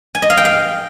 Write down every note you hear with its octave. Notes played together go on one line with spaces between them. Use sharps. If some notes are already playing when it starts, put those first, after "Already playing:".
G#5
D#5
F5
G5
F5